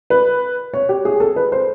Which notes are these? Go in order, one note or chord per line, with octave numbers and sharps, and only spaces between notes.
B4
C#5
G4
G#4
A4
B4
C5